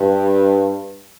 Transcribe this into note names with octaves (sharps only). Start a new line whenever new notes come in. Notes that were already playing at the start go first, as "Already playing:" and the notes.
Already playing: G2